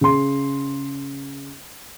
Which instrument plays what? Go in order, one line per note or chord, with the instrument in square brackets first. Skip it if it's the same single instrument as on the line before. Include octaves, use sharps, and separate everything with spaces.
[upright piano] C#3 C6